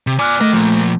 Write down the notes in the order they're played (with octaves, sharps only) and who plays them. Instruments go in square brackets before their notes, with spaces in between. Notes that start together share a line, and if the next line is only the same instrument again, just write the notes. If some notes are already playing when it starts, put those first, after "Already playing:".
[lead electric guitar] C3
[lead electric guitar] D5 G#5 [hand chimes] D6 F6 F#6
[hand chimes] A3 [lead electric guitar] A#4 D#5
[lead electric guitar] A#2 F3